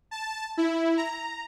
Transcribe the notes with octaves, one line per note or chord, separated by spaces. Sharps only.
A5
E4
A#5